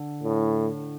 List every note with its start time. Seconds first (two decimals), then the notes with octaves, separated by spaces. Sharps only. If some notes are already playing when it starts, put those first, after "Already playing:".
Already playing: D3
0.23 A2